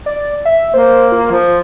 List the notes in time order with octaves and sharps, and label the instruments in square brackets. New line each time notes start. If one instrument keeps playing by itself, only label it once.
[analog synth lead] D5
E5
[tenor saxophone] A#3 [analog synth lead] C5
[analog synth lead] F4
[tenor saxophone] F3